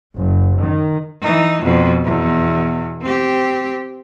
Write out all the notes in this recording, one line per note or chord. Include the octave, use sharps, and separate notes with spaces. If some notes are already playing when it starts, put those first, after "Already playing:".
F#1
D#3
E3 D#4
F2 B2
E2 B2
C4 G4